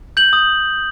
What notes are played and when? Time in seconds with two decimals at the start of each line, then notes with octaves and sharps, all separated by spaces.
0.17 G6 F#7
0.33 D#6